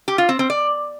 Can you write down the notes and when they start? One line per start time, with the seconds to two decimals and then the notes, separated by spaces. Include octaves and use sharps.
0.08 G4
0.18 F4
0.29 C4
0.39 C4
0.50 D5